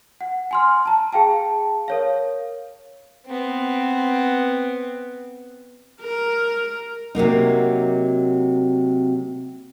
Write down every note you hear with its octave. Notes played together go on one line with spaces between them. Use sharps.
F#5
G#5 C6 F6
A5 A#5
G#4 F5 G5 A5
A#4 C#5 F5
B3 C4
A#4
C3 F#3 A#3 D#4